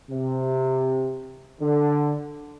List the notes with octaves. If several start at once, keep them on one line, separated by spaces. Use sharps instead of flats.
C3
D3